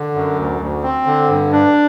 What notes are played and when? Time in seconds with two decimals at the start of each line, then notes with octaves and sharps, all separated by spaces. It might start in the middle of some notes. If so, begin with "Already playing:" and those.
Already playing: D3
0.15 F#2
0.38 D2
0.60 D2
0.83 C4
1.06 D3
1.29 G2
1.52 D4